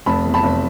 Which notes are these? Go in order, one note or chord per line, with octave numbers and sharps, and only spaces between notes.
F1 A5 B5
E2
A5 B5
F1